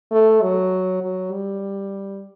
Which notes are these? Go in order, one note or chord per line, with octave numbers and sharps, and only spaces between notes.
A3
F#3
F#3
G3